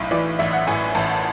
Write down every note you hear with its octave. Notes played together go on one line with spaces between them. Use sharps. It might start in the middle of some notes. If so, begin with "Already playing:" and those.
Already playing: B1 A2
E3 D5
A1 E5
F#5
A2 G#5
A1 A5